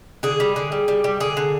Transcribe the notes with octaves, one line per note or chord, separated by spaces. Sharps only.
D3 G#4
G3
D3
G3
G3
G3
D3 G#4
D3